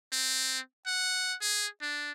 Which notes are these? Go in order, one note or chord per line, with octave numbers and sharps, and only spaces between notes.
C4
F#5
G#4
D4